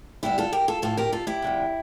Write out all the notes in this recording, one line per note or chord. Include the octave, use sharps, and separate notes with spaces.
E2 D3 G3 E4 G4
F4 A4
G4 A#4
F4 A4
A2 F3 F4 A4
G4 A#4
F4 A4
E4 G4
F2 D3 G3